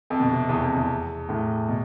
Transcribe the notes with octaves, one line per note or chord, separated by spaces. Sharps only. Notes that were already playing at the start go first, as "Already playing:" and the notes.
F2
B2
C3
E2
F2
E2
A2
B2